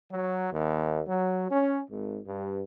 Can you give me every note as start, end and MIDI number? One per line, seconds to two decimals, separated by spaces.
0.12 0.48 54
0.53 1.02 39
1.07 1.47 54
1.50 1.81 61
1.90 2.19 32
2.27 2.63 43